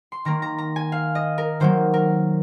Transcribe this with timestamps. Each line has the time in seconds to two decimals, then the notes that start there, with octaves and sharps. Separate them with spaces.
0.12 C6
0.25 D#3 A#3 A#5
0.42 A#5
0.58 A#5
0.76 G#5
0.92 F5
1.15 D#5
1.38 A#4
1.60 D#3 F#3 A#3 C5
1.94 A#4